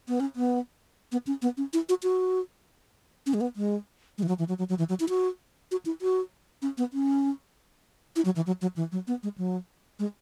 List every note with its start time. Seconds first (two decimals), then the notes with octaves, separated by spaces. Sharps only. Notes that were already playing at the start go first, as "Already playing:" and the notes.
0.08 B3
0.20 C#4
0.36 B3
1.12 B3
1.27 C#4
1.42 B3
1.57 C#4
1.73 E4
1.89 F#4
2.03 F#4
3.26 C#4
3.34 G#3
3.41 B3
3.56 G#3
4.18 G#3
4.23 E3
4.28 F#3
4.39 E3
4.48 F#3
4.59 F#3
4.69 F#3
4.78 E3
4.89 F#3
5.00 E4
5.09 F#4
5.71 F#4
5.86 E4
6.02 F#4
6.62 C#4
6.78 B3
6.93 C#4
8.16 E4
8.25 F#3
8.36 E3
8.47 F#3
8.62 F#3
8.76 E3
8.92 F#3
9.07 B3
9.23 G#3
9.38 F#3
9.99 G#3